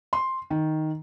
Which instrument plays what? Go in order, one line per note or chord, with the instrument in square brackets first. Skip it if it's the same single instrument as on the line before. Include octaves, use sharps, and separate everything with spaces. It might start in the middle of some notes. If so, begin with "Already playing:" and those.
[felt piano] C6
D#3